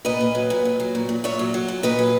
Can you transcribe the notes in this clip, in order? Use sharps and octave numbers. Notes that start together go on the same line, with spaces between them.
A#2 B4 D#5
A#2
F#3
A#2
A#2
F#3
A#2
A#2
A#2 C#5 E5
F#3
F#3
A#2
A#2 B4 D#5
F#3